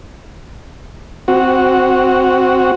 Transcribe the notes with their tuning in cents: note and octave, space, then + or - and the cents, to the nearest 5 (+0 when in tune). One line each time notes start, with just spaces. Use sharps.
C4 +0 F#4 +0